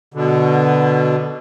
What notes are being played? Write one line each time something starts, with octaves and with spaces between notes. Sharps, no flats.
B2 D3